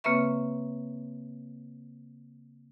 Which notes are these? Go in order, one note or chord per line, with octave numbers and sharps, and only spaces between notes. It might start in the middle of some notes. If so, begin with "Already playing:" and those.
C#3 A#3 C4 B4 E5 C#6